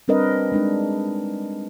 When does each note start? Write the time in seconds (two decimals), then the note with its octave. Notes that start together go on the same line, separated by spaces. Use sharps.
0.08 G3 C4 D4 A#4 B4 D#5
0.52 G#3 D4 D#4